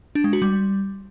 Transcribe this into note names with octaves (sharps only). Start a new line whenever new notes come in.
D4
G#3
F#4
G3